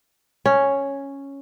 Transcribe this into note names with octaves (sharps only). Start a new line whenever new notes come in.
C#4